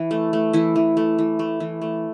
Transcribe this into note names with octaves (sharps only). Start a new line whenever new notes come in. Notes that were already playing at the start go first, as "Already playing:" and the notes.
Already playing: E3
A3
A3
E3 E4
E3
A3
E3
A3
E3
A3